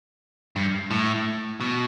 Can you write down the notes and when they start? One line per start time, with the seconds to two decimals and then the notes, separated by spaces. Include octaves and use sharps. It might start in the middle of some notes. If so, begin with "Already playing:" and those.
0.56 G2
0.91 A2
1.60 B2